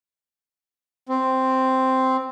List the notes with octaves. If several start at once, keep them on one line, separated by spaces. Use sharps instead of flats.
C4